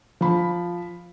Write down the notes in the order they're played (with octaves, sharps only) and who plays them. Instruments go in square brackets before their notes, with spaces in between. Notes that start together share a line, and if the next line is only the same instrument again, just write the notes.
[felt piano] F3 B5